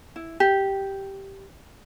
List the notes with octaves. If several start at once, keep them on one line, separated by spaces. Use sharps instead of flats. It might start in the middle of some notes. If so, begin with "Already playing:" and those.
E4
G4